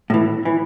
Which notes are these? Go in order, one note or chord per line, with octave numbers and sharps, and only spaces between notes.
A2 E3
E3